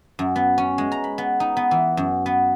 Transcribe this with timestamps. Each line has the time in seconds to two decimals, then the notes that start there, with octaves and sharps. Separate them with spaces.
0.19 F#2
0.36 B3
0.58 C#4
0.78 G#3
0.92 A#5
1.04 B5
1.18 B3
1.40 D#4
1.57 B3
1.71 E3
1.97 F#2
2.26 B3